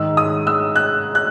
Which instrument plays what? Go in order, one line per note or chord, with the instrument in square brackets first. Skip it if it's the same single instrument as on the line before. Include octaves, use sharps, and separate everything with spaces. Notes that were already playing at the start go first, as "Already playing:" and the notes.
Already playing: [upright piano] G#2 D#3 G#3 D#4 E6
D#6
E6
F#6
F#6